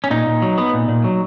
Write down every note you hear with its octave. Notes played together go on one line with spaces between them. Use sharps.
C#4
A#2 D#4
A#2
F#3
B3
A#2
A#2
F#3